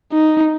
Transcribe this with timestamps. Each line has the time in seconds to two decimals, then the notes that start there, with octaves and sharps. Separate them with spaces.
0.13 D#4